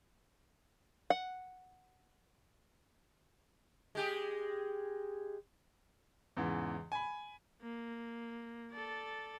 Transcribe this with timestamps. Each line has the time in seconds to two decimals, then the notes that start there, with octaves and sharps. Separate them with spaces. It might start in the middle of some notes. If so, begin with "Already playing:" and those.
1.10 F#5
3.95 G#3 G4 G#4
6.37 E2 G#2 C#3 E3
6.92 G#5 B5
7.62 A#3
8.72 A4 D5